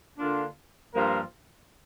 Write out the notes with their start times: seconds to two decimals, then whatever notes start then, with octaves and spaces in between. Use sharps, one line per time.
0.17 D3 A#3 D4 F4
0.92 G2 F3 A#3 F4 A#4